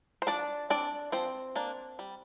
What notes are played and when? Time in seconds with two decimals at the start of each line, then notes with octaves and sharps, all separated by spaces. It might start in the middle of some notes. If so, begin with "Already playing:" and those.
0.22 C5
0.27 F3 D4 D5
0.70 C4 D4 D5
1.12 F3 C4 C5
1.56 A#3 D4
1.99 G3